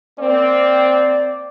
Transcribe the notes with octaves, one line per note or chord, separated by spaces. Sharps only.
A#3 C4 D5